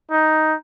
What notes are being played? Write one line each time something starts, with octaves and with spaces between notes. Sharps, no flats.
D#4